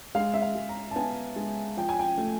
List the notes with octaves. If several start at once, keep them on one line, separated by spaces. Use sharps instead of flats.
G#3 F5
E5
F5
G#3
A#5
A5
B3 G#5
G#3
F3 G5
G#5
G5
A3